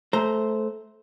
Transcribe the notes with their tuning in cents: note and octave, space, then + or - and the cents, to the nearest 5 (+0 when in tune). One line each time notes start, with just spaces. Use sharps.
A3 -15 C5 +0 A#5 +0